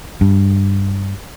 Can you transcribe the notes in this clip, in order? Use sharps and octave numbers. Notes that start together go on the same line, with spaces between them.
G2